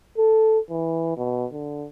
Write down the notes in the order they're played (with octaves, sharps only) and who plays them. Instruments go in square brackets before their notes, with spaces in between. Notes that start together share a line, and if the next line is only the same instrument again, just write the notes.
[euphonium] A4
E3
B2
D3